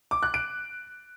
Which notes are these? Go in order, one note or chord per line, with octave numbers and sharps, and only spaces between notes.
D6
F#6
D7